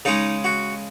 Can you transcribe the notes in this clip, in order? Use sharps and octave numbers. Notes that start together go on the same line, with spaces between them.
C#3 G#3 D#4
F#4